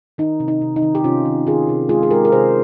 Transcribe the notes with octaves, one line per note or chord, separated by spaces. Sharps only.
D#3 D#4
C3
D#4
C3
D#4
D#3
G4
C3 C#4 F4
D#3
D#3 F4 G#4
C3
G#3 F4 G#4
G#4
G#3 G4 A#4
A#4
C3 G#4 C5